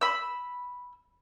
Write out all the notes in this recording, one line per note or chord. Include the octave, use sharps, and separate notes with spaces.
B5 E6